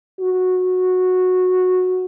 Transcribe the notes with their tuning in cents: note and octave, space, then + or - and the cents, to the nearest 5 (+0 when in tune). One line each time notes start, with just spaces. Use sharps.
F#4 -15